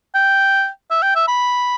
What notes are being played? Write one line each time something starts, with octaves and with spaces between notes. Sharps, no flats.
G5
E5
G5
E5
B5